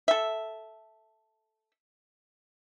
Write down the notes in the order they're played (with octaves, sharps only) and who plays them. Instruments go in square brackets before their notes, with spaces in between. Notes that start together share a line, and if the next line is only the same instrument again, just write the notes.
[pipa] A4 E5